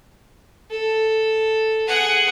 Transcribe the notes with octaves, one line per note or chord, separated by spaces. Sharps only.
A4
G#4 F#5